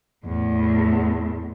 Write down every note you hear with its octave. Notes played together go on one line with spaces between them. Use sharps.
E2 A2